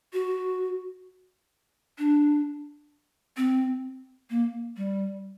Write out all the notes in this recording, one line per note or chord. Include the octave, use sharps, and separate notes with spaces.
F#4
D4
C4
A#3
G3